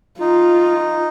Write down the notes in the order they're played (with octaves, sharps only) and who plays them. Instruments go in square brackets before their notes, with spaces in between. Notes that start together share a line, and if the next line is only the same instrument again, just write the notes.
[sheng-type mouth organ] D#4 [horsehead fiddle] F4